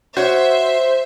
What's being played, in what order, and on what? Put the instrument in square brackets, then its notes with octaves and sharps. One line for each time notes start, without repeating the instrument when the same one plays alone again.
[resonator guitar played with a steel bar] F#4 C#5 [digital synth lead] C5 [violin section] E5